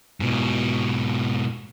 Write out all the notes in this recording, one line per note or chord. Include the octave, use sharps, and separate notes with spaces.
G#2 B2